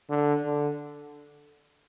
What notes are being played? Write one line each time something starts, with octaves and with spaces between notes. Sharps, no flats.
D3
D3